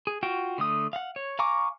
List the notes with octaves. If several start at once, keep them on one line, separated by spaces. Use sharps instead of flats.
G#4
F4 F#4 G5
D3 A3 D#6
F5 F#5
C#5
F5 G#5 A#5 C#6 D6